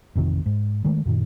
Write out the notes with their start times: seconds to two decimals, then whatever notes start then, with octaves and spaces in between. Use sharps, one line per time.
0.16 A1 F2 C3 D#3
0.46 G#2
0.84 D#3 G#3 A3
1.06 F#2 A#2 D#3